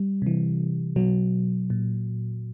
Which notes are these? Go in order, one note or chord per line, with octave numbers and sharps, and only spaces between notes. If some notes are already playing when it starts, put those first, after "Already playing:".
Already playing: G3
C3 E3
B2 F#3
A#2